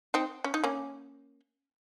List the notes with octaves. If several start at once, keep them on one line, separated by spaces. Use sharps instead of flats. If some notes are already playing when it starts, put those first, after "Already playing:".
C4 D#4
C#4
D#4
A#3 C#4